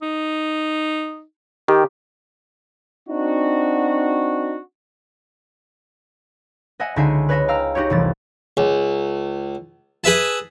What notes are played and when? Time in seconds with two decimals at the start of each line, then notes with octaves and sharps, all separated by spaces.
0.02 D#4
1.68 D#3 G4
3.08 C4 D4 D#4 F#4
6.80 D#5 E5 F#5 G#5
6.96 C#2 D3 D#4 E5 G#5 C7
7.29 B4 C#5 D#5 E5 G#5
7.48 F5 G5 A#5 E6 F6
7.75 D#4 F#4 G4 C#5
7.90 F1 C2 E3 A6
8.57 C#2
10.04 G#4 B4 E5 A5